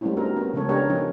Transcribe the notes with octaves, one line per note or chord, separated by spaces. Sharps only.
G3 A3 A#3 C4 C#4 E4
B3 C4 D4 D#4 F#4 A#4
B3 C#4
C#3 F3 G#3 C#4 A4 C#5
B3 D4 G4 G#4 A#4 C#5
F3 C#4 D#4 C5